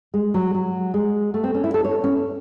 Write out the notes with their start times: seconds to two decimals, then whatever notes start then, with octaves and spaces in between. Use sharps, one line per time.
0.14 G#3
0.34 F#3
0.54 F#3
0.94 G#3
1.34 A3
1.44 C4
1.54 C#4
1.64 E4
1.74 A4
1.85 C#5
2.04 C#4